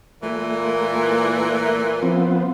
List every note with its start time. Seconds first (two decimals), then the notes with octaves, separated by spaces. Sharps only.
0.23 A#2 E3 A3
2.03 F3 B3 C4